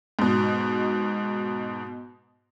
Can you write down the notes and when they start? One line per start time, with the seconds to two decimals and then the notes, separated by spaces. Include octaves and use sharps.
0.19 G#2 B2